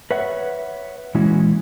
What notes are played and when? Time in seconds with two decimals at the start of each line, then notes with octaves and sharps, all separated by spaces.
0.11 B4 C#5 E5 F#5
1.15 A#2 E3 G#3 C#4 E4 F#4